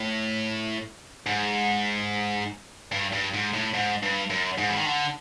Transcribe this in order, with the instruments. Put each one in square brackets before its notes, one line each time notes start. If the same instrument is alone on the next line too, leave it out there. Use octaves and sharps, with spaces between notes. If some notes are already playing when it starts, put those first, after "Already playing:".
Already playing: [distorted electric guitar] A2
G#2
G2
G2
G#2
A2
G#2
G2
F#2
G#2
E3
D#3
D3